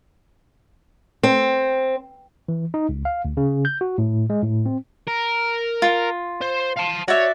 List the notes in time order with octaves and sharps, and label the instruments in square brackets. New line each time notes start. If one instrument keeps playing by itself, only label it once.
[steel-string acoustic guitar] C4
[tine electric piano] E3
D#4
C#2
F5
D2
C#3
G6
F#4
A2
G#3
A2
C4
[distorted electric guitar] A#4
[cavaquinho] F4
[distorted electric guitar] C5
F5 A5
[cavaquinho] F#4 D5 E5 [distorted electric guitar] C#5